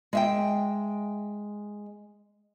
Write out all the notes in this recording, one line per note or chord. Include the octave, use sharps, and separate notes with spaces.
G#3 E5 G5